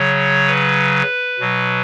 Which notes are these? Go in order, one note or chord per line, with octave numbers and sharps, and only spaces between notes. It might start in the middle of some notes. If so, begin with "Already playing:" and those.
Already playing: C#3 F#3 C#5
B4
B2 F#3